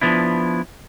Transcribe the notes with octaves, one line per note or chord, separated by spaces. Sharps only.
F3 B3 D4 E4